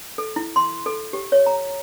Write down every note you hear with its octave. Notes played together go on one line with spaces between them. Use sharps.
A4
E4
C6
A4
G4
C#5
A#5